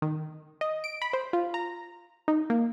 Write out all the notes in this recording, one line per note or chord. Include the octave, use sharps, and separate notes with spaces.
D#3
D#5
D7
B5
C5
F4
A#5
D#4
A#3